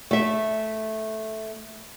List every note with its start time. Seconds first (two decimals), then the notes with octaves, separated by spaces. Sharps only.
0.11 A3 E5